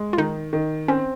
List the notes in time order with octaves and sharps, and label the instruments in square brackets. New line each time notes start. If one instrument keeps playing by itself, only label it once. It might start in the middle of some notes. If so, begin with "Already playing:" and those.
Already playing: [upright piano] G#3
[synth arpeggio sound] F4
[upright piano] D#3 [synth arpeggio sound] D#4
[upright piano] D#3
[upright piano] C4 [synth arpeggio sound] C#4